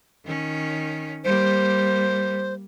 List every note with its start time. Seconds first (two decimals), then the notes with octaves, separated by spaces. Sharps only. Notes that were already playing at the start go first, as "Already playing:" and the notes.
0.25 D#3 C#4
1.24 G3 A#3 C5